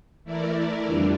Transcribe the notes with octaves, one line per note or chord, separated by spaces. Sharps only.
E3 A3 E4 A#4 D5
F2 D3 G3 D4 F4